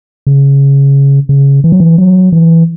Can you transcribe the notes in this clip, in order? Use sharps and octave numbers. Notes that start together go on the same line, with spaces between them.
C#3
C#3
E3
F#3
E3
F#3
E3